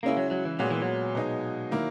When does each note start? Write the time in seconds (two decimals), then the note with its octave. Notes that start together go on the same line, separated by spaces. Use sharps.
0.03 C#3 G#3 A#3 C#4 E4
0.17 F#3
0.31 F#3
0.45 E3
0.59 A#2 F#3 G#3 B3
0.70 E3
0.82 F#3
1.15 B2 G#3 D#4
1.71 D#3 A#3 E4